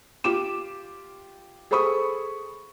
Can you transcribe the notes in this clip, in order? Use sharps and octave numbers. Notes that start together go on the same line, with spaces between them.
F4 G4 D6 E7
G#4 A4 C5 B5 C#6 D#6